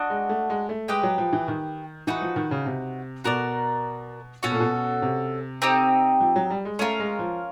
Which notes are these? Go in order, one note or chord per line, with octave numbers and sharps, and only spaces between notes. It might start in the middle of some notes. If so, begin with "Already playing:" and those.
Already playing: D4 F#4 D#5
G#3
A3
G#3
A3
G#3 G4 B4 D#5 G5
F#3
F3
E3
D#3
E3 D#4 F#4 B4
F3
D#3
C#3
C3
B2 F#4 A#4 D5
B2 C#4 F#4 A4
A#2
B2
C3
C4 D#4 G4
F3
F#3
G3
G#3
A3 C#4 F4 A#4
G#3
F3